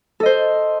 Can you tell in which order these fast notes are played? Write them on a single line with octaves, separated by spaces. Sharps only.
A4 D#5 C5